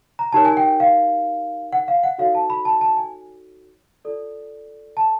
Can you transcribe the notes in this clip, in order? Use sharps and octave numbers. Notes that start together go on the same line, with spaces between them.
A#5
D#4 G4 A#4 C#5 A5
G#5
G5
F5
F#5
F5
F#5
D#4 F#4 A4 C#5 F5
A5
B5
A5
A5
G#5
F4 A4 D5
A5